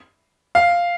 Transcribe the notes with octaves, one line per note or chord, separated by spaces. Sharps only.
F5